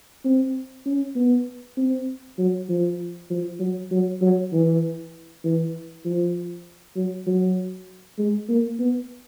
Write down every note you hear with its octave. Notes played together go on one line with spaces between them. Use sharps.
C4
C#4
B3
C4
F#3
F3
F3
F#3
F#3
F#3
E3
E3
F3
F#3
F#3
G#3
A#3
B3